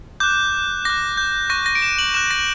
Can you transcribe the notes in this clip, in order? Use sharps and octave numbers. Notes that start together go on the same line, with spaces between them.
D6 F#6 G6
D6 F#6 A#6
G6
C#6 F#6 A#6
A#6
D7
E7
F#7
C#6 F#6 E7
A#6